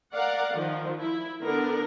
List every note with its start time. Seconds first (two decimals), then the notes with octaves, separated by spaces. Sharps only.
0.14 A#4 D5 F5 F#5
0.53 D#3 F3
0.99 E4
1.42 D3 B3 D4 A#4